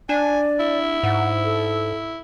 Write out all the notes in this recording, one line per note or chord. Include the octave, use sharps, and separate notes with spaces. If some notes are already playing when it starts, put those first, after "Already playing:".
D4 D5 G#5
E4
G#2 F#5
A4